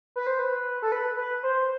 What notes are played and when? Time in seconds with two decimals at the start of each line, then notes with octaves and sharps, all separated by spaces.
0.16 B4
0.27 C5
0.39 B4
0.82 A4
0.92 B4
1.17 B4
1.43 C5